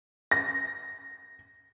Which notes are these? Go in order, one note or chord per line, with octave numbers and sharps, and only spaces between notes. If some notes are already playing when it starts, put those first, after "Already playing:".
A#6